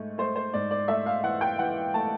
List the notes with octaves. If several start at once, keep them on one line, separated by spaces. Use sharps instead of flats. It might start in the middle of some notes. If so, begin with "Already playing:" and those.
Already playing: G#2 A3
A3 C5
C5
G#2 D5
D5
A3 E5
F5
E3 F#5
G5
E3 F#5
A3 A5